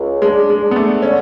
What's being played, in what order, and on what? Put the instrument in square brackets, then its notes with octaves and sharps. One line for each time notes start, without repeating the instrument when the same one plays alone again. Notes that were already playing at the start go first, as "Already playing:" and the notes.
Already playing: [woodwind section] C#2
[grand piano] G#3 [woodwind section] D4
[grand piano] G#3
[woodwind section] D4
[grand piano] B3
A3
[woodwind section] D3 [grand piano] C#4